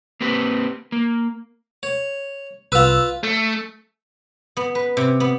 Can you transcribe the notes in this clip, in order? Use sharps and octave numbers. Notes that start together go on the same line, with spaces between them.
A#3 C4 G4 B4
A#3
C#5
C2 F4 B4 E6
A3
B3
B4
C3
B3